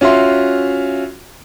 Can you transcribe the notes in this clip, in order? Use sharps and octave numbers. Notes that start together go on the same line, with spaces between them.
C#4 F4 F#4 E5 C6